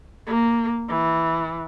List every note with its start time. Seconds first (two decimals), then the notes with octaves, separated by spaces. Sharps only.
0.27 A#3
0.89 E3